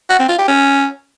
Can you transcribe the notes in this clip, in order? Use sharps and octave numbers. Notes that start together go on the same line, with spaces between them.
F#4
C4
F4
G4
C#4